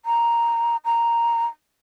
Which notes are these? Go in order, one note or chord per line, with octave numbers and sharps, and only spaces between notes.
A#5
A#5